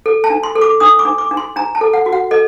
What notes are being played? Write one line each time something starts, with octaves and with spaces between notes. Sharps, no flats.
A4
A5
D4
C6
A4
D6
D4 D#6
D6
D4
D6
D4
C6
D4 A#5
A5
A4
F#5
F#4
F#5
A4 D#5